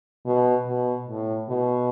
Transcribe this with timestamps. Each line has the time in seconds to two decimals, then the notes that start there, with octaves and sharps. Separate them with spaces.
0.26 B2
0.67 B2
1.07 A2
1.49 B2